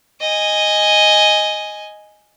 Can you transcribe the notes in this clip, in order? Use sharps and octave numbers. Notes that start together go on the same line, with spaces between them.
D#5 G#5